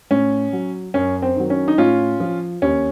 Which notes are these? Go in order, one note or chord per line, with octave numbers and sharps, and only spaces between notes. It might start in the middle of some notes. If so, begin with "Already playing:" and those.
A2 C#4
F#3
F#2 C#4
C4
D#3 F#3
C#4
D#4
A2 C#4 F4
F3
D#2 C#4